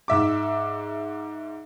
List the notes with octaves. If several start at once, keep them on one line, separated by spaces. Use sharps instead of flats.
G#2 E5 D6